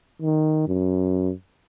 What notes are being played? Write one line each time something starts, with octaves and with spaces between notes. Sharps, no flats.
D#3
F#2